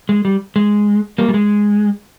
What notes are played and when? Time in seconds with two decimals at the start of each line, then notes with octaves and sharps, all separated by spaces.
0.09 G#3
0.25 G3
0.56 G#3
1.18 G3 A#3
1.29 G3
1.34 G#3